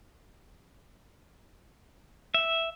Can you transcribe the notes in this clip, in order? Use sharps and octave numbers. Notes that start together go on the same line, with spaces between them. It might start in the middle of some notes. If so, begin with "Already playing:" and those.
E5